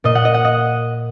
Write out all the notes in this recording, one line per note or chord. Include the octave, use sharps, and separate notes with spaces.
A#2 D#5
F#5
D#5
F#5
D#5